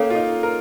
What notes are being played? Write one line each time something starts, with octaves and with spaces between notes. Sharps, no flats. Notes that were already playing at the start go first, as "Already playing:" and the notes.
Already playing: A#3 C#4 A4 C#5 F5
F4
D#4
A#4